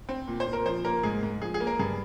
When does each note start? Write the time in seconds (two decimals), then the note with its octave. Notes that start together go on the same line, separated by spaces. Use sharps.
0.09 C4
0.28 A#2
0.40 C5
0.47 A#2
0.53 A#4
0.66 F3 C5
0.85 A#3 A#4
1.03 G#2 G#4
1.23 G#2
1.42 F3 G#4
1.54 G#4
1.60 A#3
1.67 A#4
1.79 G2 G#4